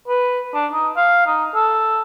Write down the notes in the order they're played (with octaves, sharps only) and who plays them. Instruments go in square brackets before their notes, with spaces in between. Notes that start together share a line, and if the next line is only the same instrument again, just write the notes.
[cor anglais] B4
D4
D#4
F5
D#4
A4